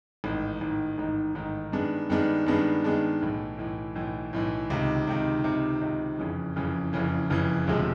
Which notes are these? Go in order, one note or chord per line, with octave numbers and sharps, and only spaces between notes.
A1 G#2 D#3
A1 G#2 D#3
A1 G#2 D#3
A1 G#2 D#3
G2 D#3 G#3 B3 D4
G2 D#3 G#3 B3 D4
G2 D#3 G#3 B3 D4
G2 D#3 G#3 B3 D4
B1 A2 E3
B1 A2 E3
B1 A2 E3
B1 A2 E3
C#2 C3 D#3
C#2 C3 D#3
C#2 C3 D#3
C#2 C3 D#3
F#1 F2 C#3 E3
F#1 F2 C#3 E3
F#1 F2 C#3 E3
F#1 F2 C#3 E3
E1 D2 C3 F3 G#3